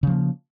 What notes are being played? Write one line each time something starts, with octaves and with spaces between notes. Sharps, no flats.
C#3 F3 A#3